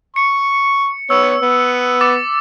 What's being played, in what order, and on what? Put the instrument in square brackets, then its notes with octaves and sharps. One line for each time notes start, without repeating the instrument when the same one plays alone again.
[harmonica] C#6 [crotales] C#7
[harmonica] B3 C#5 [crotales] E6
[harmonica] B3
[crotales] D6 A6